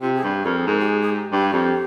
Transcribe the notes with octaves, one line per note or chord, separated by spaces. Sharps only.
C3 F4
G#4
G2 G4
F2 A#4
G#4
G#2 A#4
G4
G#4
G#4
G4
G2 G4
F2